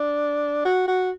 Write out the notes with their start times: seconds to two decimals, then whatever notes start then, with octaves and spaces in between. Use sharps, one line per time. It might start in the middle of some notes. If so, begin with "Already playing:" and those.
Already playing: D4
0.65 F#4
0.87 F#4